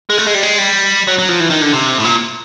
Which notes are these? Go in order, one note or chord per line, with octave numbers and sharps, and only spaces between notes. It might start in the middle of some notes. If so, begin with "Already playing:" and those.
G#3
A3
G#3
G3
G#3
G3
F#3
F#3
F3
E3
D#3
D3
C3
A2
A#2